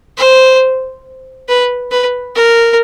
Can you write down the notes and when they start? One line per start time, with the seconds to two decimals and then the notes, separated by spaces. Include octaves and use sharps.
0.18 C5
1.49 B4
1.91 B4
2.35 A#4